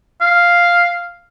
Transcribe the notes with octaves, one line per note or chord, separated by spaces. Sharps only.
F5